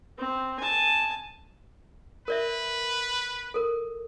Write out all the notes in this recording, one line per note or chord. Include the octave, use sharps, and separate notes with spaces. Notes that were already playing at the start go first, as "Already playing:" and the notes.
C4
G#5 A5
A#4 B4 D5 E5
A4 A#4